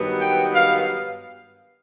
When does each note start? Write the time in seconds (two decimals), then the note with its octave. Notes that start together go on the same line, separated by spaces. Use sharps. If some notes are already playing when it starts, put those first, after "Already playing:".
Already playing: G2 D#3 F#3 B3
0.20 G5
0.54 F5